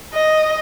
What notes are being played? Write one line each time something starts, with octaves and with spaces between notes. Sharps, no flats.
D#5